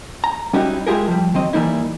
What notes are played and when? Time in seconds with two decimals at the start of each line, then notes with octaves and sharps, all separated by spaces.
0.24 A#5
0.53 G3 C#4 D#4 E4 F#4 G4
0.87 G#3 E4 F4 G4 G#4 A#4
1.08 F3 G3
1.34 D#3 F#3 C4 D#5
1.53 E3 G3 A#3 D#4 E4